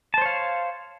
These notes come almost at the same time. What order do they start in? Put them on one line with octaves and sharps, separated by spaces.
A5 C5 C#5 F5